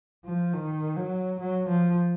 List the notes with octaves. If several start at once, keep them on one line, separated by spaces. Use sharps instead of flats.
F3
D#3
F#3
F#3
F3